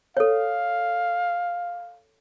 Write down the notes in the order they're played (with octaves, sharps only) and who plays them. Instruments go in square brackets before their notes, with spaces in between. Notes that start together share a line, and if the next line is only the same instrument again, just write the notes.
[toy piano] A4 C#5 [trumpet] F5